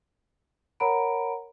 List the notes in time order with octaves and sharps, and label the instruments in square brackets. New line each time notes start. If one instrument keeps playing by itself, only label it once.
[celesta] A#4 C#5 F#5 A#5 B5 D7